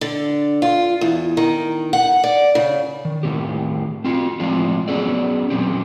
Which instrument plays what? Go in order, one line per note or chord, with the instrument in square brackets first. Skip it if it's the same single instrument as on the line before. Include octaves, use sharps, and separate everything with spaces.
[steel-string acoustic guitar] D3
F4
E2
D#3
F#5
D5
C#3
[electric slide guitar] D#3
A2 D#3 E3 B3 C4 G4
C4 F4 F#4
A2 F3 G#3 C4 D4 F4
F#3 B3 C#4 G#4 A4 D5
A#2 F#3 C4 D4 G4